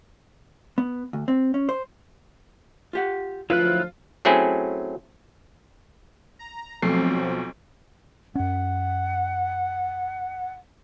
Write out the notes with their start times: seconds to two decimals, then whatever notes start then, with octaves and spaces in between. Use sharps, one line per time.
0.78 B3
1.13 D2
1.28 C4
1.54 C#4
1.69 C5
2.93 F4 G4 F#5
3.50 D2 F3 F#3 E4 F4 B4 F#6
4.25 F#3 A3 C4 C#4 E4 G#4
6.39 A#5
6.82 B1 F3 F#3 A3 C4 C7
8.35 F#2 C#4 F#5